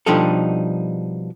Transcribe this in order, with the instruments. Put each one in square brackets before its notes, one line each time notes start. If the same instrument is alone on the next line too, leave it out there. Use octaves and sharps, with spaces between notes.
[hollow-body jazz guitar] B2 F3 G3 D4 D#4 A4